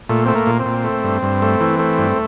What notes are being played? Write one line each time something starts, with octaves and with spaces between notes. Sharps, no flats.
A#2 A3
A3 C4
A#3
A#2
C4
A#2
A3
G2
G2
A3
E3
A3
G2